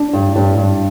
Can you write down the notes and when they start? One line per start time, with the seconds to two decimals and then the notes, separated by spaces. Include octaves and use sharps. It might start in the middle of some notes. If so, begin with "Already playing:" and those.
Already playing: D4
0.13 G2
0.36 G2
0.58 G2